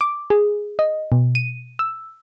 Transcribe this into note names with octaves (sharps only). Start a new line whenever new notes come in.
D6
G#4
D#5
B2
D#7
E6